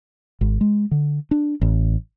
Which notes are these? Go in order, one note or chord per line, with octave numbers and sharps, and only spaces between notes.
G#1
G#3
D3
D4
A1